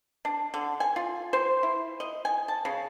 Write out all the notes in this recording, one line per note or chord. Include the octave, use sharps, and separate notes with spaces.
D4
D3
G#5
F4
C5
E4
D#5
G#5
A5
C#3